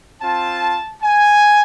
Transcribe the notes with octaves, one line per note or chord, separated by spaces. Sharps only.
C4 F4 A5
G#5